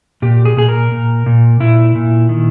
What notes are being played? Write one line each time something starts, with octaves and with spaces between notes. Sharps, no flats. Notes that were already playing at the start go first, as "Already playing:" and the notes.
A#2 G4
G#4
A#2 G#4
A#4
A#2
A#2
A#2 E4
A#2
D#3